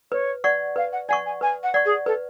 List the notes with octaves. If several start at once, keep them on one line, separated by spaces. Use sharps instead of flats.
B4 C#5
D5 F#5 C#6
B4 F5
F#5
D5 F#5 G#5 C#6
G#5
B4 G#5
F#5
D5 F#5 C#6
G#4
A4 B4